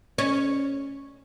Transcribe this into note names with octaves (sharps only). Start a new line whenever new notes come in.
C#4